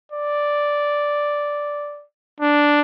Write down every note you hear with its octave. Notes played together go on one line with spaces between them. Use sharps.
D5
D4